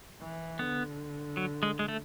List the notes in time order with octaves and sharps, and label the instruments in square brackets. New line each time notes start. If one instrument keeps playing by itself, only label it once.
[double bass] E3
[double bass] D3 [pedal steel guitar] B3
[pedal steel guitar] F#3
G#3
G#3
A3